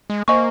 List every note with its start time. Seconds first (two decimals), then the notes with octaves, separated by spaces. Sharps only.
0.10 G#3
0.28 A#3 C5 D#5 G#5 C#6